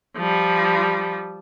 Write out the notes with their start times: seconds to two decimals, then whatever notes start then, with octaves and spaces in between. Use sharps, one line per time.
0.17 F3 G3